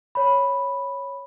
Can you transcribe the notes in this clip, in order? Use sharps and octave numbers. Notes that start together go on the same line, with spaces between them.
C#5 B5